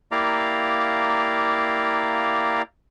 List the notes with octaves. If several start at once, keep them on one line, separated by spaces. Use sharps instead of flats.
A#3 E4 G4 D5 F5 A#5